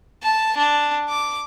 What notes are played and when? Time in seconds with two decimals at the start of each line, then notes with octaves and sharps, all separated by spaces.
0.23 A5
0.58 D4
1.09 D6